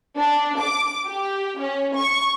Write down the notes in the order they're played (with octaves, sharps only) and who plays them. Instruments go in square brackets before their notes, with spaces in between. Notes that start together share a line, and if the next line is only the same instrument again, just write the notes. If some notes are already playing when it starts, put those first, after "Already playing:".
[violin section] D4
D6
G4
C#4
C#6